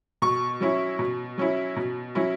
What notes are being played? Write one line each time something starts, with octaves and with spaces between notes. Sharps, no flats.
B2 C#6
F#3 C#4 E4
B2
F#3 C#4 E4
B2
F#3 C#4 E4